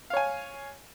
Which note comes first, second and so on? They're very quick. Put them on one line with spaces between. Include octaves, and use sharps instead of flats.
F5 C#5 G#5